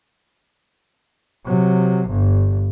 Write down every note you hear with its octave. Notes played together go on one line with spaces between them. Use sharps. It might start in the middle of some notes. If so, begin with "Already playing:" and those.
C3 F#3
G1 G2